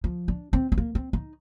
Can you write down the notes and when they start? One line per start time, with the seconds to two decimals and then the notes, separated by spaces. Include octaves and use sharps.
0.04 F3
0.28 D4
0.53 C4
0.72 C4
0.78 A#3
0.95 C4
1.13 D#4